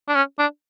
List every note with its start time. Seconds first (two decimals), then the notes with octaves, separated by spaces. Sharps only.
0.08 D4
0.15 C#4
0.39 D4